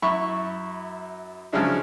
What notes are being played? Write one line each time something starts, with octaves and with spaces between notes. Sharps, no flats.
F#2 E4 B5 C#6
C#3 F3 F#3 G#3 D4 E4